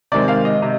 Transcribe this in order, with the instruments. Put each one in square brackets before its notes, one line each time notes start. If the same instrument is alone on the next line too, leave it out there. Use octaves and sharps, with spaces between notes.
[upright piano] C3 D#3 G#3 C4 D5
F5
D#5
C3 D#5